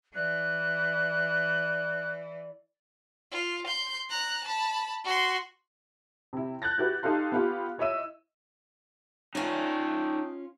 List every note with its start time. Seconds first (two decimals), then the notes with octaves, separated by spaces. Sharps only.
0.15 E3 D5 F#6
3.32 F4
3.67 C6 G6
4.10 A#5 F#6
4.44 A5 B5
5.04 F#4 C6
6.33 C3 E4
6.62 F#6 G6 A6 A#6
6.78 E4 F#4 G4 B4
7.03 D#4 G4 A4 F5 C6
7.32 B3 F4 G4
7.78 E4 C#5 D#5 E5 E6 D#7
9.35 A3 C#4 D#4 F4 C#5 D#5 G5 G#5